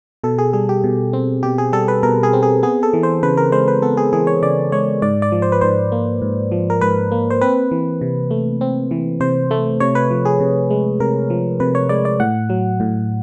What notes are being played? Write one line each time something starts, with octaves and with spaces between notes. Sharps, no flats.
B2 A4
G#4
G3 G#4
G4
B2
C4
B2 G4
G#4
G3 A4
B4
B2 A#4
G#4
C4
G#4
B3 G#4
A4
E3
C5
C#3 B4
A#4
G#3 C5
B4
B3 A4
G#4
E3 G#4
C#5
C#3 D5
G#3 C#5
G#2 D5
D5
F3
C5
B4
G#2 C5
A#3
G#2
F3
A#4
G#2 B4
A#3
C5
C4 B4
E3
C3
A3
C4
E3
C3 C5
A3
C3 C#5
B4
F3
G#4
C3
G#3
C3 A#4
F3
C3 B4
C#5
G#3 D5
D5
A2 F#5
F#3
A2